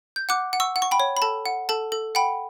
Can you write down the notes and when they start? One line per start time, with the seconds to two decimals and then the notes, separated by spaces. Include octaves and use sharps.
0.16 G6
0.29 F#5 D6 F#6
0.53 F#5
0.60 C#6 E6
0.76 F#5
0.82 C#6
0.91 G5 B5
1.00 C#5
1.17 B5
1.22 A4 A5
1.46 F#5
1.69 A4 A5
1.92 A4
2.15 F#5 G5 B5